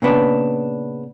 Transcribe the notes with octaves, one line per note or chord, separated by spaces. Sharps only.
A#2 C#3 B3 D4